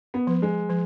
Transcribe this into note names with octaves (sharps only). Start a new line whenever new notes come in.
B3
F3
G#3
F3